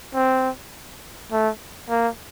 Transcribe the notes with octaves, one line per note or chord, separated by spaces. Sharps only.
C4
A3
A#3